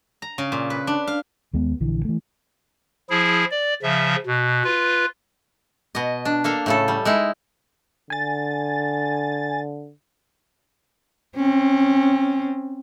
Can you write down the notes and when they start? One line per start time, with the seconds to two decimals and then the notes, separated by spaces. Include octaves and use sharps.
0.22 A#5
0.38 C#3
0.52 A#2
0.70 B4
0.87 D4
1.07 F5
1.53 D#2 G#3 B3
1.80 A#1 D3 E3
2.05 E3 A3
3.10 F3 E4 G#4
3.51 D5
3.83 C#3 F3 E5
4.27 B2
4.64 F4 B4
5.95 B2 D#5
6.25 D4
6.44 A#3 A4 F5
6.66 A2 C#3 A4
6.88 G3
7.05 G#3 D#4 E4
8.10 D3 G#5 A6
11.35 C4 C#4